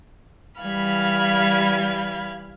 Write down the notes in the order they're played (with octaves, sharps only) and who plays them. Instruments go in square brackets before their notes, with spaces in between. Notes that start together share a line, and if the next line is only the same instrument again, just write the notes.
[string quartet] E3 G3 F5 B5 G#6